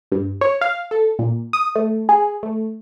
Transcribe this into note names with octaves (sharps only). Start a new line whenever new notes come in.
G2
C#5
F5
A4
A#2
D#6
A3
G#4
A3